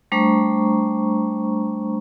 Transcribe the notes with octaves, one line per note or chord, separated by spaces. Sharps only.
G3 A3 D4 C5 A#5 C#6